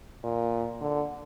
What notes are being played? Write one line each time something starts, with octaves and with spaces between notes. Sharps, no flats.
A#2
D3